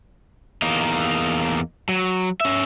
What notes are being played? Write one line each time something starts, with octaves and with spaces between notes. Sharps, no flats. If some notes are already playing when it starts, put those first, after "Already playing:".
E2 A#3 D#4
F#3
C#4 E5